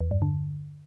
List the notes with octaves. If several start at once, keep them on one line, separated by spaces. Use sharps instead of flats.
E2
G2
D3